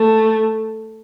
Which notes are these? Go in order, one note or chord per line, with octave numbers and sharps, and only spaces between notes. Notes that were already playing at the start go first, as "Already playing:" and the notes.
Already playing: A3